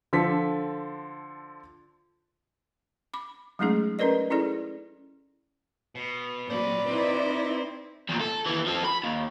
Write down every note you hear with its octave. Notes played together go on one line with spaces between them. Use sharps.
D3 F3 A4 B6
B5 D6
F#3 G#3 A3 C#4 D#4 G#4
C#4 D#4 A#4 B4 D5 D#5
C#4 E4 G#4 A4 D5
B2
A#2 F#3 C4 C5 D5 B5
C4 D#4 E4 B4
E2 A#2
A4
D#2 E3
F3 A4
B5
D#2